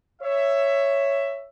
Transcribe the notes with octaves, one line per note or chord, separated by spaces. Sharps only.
C#5 E5